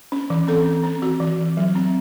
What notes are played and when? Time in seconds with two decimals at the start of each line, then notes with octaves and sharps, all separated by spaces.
0.12 C#4
0.30 E3
0.48 C4 A4
0.66 C4
0.84 C4
1.02 E3 F#4
1.20 E3
1.39 E3
1.57 F#3
1.75 C4